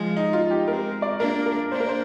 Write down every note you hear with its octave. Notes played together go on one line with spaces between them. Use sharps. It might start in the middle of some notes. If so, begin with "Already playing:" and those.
Already playing: F3 G#3 F4
D#4
F4
G4
G#3 C4 A#4
D5
A#3 D4 A#4
A#4
A#3 D4 C5
A#4
C5